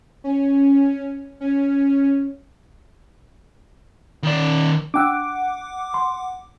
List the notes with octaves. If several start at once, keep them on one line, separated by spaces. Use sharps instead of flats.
C#4
C#4
D#3 D5
D4 F#5 G5 D6 E6
C6